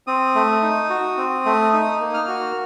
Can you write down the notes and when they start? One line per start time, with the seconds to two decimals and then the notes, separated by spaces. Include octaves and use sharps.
0.07 C4 D#6
0.35 A3
0.62 D#4
0.90 F#4
1.17 C4
1.45 A3
1.73 D#4 D#6
2.00 A#3
2.14 F6
2.28 F#4